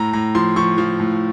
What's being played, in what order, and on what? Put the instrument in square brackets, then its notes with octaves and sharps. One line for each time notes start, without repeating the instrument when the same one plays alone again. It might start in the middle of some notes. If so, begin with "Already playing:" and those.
Already playing: [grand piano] A2 A#5
A2 A#5
F3 C6
F3 C#6
F3
A2